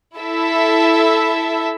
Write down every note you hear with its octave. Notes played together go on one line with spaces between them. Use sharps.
E4 A4 E5